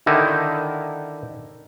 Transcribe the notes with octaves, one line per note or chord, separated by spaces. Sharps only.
D3 D#3 D#4 E4